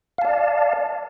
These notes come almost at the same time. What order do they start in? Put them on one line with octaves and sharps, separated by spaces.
F5 A5 D5